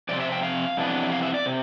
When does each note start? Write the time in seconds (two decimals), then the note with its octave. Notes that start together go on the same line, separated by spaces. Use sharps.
0.09 F2 C3 C4 D5
0.20 E5
0.32 G5
0.43 F5
0.77 F2 C3 E3 B3 D4
1.12 F5
1.23 E5
1.34 D5
1.46 C3